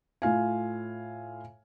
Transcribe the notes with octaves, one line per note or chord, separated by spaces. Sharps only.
A2 F4 F5 G#5